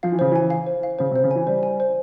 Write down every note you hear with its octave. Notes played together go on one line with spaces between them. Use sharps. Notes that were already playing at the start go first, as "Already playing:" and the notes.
F3 F5
E3
C#3 C5
E3 G#5
F5
C5
F5
C#3 C5
C3
C5
C#3
E3 G#5
G3 C5
G#5
C5